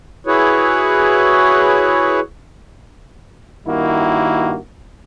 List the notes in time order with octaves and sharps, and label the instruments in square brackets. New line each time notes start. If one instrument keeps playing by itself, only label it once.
[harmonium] E4 F#4 G#4 B4 C#5
[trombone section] G2 D#3 A#3 E4 F#4